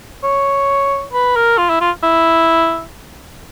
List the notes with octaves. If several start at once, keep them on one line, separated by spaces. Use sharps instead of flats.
C#5
B4
A#4
F4
E4
F4
E4